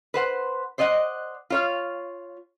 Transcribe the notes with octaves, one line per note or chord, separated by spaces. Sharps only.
B4 C5 F#5
C5 D5 D#5 F5 F#5
F4 C#5 F5